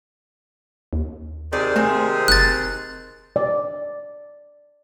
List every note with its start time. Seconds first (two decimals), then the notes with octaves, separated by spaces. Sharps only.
0.93 D#2
1.53 C3 D#3 G#4 D5
1.76 A3 C4 G#5
2.28 F#1 F#6 A6
3.36 D5